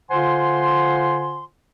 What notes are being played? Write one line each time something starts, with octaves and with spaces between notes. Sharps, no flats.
D3 F4 C5 F#5 G#5 C6